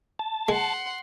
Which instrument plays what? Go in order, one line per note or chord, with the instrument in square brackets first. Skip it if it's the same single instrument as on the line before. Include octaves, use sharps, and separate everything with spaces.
[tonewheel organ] A5
[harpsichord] G#3 [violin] F#5 C6